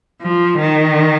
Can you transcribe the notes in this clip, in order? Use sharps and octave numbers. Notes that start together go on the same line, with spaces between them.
F3
D#3